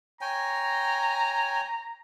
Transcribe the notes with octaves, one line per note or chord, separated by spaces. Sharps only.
C#5 G5 G#5 A#5